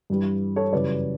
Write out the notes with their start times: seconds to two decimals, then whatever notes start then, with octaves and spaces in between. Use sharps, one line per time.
0.10 G2 E3 G3
0.56 A4 C#5
0.72 F#2 C#3 E3 G3 B4 D5